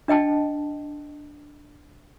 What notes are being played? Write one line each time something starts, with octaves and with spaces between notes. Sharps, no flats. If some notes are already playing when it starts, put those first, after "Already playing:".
D4 D#5 G5 A5